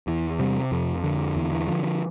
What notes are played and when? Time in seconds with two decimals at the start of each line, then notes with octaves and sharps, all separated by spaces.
0.07 E2 E3
0.39 C3 G3
0.72 F2
1.04 D3
1.36 E2 E3
1.52 E3
1.67 D3 F3
1.84 F3